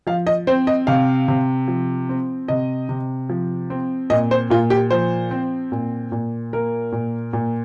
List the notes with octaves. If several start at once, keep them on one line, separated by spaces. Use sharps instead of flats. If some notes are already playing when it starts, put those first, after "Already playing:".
F3 F5
D#5
C4 C5
D#5
C3 F5
C3
F3
C4
C3 D#5
C3
F3
C4
A#2 D#5
C5
A#2 F4
G4
F3 C5
C4
A#2
A#2
A#3 A#4
A#2
A#2